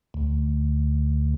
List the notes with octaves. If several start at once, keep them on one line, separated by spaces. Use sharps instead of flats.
D2